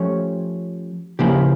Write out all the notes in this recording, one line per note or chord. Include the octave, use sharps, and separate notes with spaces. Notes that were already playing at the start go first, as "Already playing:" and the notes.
Already playing: F3 A3 C#4 G4 C#5
C#3 F3 A#3 E4 G4